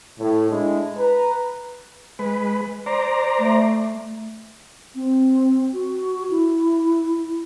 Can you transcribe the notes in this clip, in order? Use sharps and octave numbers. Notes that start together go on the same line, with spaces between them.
A2
G#3 D4 E4
B4 A#5
G#3 B4
C5 D5 A#5
A3
C4
F#4
E4